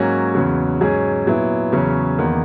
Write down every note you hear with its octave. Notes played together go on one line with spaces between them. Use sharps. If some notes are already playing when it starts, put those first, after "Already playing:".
Already playing: G#2 F#3 A#3 C#4 F#4
E2 C#3 F#3
G#2 F#3 C#4 G#4
A#2 F#3 B3 E4
E2 C#3 F#3 C#4
E2 D#3 A#3